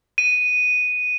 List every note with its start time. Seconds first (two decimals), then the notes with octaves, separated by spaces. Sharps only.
0.18 D#7